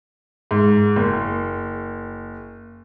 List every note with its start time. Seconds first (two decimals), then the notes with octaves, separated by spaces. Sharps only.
0.51 G#2
0.96 F#1